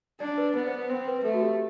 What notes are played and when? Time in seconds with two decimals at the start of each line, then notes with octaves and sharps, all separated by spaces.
0.20 D4 D5
0.38 B4
0.55 B3 B4
0.67 C5
0.78 B4
0.89 C4 C5
1.07 B4
1.19 B4
1.24 A3 A4
1.34 F#4
1.42 G4